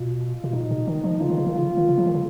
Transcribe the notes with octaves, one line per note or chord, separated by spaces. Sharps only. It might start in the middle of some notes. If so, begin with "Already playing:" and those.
Already playing: B2 F4
B2
A#2 D#4
B2
D#3
F3
C#3 F4
D#3
C#3
D#3
C#3 F4
D#3
C#3
F3
D#3
C#3